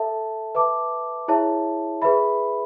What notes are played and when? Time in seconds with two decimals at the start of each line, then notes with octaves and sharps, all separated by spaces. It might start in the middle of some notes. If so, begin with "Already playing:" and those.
Already playing: A4 E5 A5
0.55 B4 E5 A5 D6
1.28 E4 G#4 C#5 E5 A5
2.02 G#4 B4 E5 B5